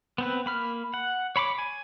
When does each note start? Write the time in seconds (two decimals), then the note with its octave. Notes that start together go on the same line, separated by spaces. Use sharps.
0.18 B3 C4 B4
0.46 A#3 B5 F6
0.94 F#5
1.36 C#5 B5 C6 D6
1.58 G#5